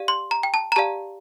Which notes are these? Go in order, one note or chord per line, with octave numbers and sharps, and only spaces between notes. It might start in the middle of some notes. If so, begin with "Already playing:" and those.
Already playing: G4 D5 F5
C6
A#5
G5
A5
A#5
G4 D5 F5 A5